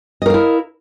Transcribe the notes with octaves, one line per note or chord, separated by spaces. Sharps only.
E4 A#4 D#5 F5